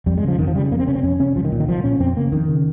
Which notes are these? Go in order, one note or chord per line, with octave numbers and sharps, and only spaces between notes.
F2 G3
G#3
C#3 F3
F2 D#3
F3
C#3 G3
F2 A#3
C4
C3 C#4
C4
F2 C#4
C3 C#4
C2 F3
D#3
A#2
D#3
C2 F3
A#2 C#4
F2 C4
C#3 A#3
F2 D#3
C#3